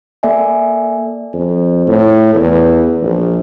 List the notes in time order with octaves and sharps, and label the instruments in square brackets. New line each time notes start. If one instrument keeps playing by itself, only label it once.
[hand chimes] A#3 A4 D5 E5 G#5
[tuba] F2
A2
E2
A#1